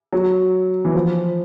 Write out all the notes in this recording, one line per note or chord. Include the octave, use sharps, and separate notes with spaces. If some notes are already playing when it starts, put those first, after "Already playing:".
F#3
E3
F3